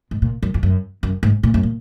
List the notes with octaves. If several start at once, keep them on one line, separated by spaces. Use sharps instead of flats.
G#2
A#2
F#2
F2
F#2
F#2
G#2
A#2
F#2
A#2